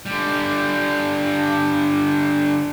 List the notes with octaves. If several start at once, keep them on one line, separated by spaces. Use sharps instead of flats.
D3 G3